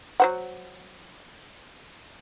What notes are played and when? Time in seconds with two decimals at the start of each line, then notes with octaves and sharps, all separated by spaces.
0.20 F#3 C5 F#5